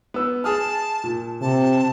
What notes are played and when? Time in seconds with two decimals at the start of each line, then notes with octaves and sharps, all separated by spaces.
0.14 B3 E6
0.44 G#4 A5 D#6 F6
1.04 A#2
1.41 C3 A5